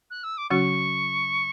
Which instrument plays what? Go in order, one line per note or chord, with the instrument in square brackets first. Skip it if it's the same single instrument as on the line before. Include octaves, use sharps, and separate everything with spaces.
[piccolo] F#6
E6
D6
[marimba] C#3 F#3 C#4 F#4 [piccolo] C#6